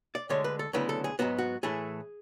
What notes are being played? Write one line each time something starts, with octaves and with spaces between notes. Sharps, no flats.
D5
D2 D3 G#3 C#5
B4
A4
D2 C#3 F#3 B3 E4 B4
A4
G#4
G#2 F#3 B3 F#4
F#4
A2 E3 A3 E4 G#4